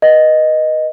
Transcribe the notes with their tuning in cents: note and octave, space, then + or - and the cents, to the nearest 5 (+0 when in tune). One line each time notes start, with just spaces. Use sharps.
B4 -30 D#5 +0